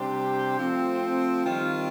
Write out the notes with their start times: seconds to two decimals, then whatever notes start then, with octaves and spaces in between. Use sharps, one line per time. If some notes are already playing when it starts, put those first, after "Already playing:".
Already playing: C3 G3 D4 G4 C5
0.59 F3 A3 C4
1.44 D#3 G3 C4 F4